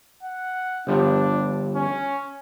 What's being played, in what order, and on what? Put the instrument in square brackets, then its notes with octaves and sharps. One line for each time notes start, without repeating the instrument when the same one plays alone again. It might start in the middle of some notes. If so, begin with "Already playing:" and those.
[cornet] F#5
[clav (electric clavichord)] G1 G2 F3 [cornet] D4
[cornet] C#4